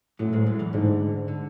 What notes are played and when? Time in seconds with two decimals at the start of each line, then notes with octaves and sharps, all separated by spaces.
0.19 F#2 A2 F#3
0.33 G#2 G#3
0.46 F#2 F#3
0.59 E2 E3
0.73 D2 G#2 D3
1.28 D3